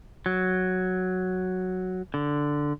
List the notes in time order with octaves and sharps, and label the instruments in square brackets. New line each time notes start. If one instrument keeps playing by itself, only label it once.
[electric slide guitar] F#3
D3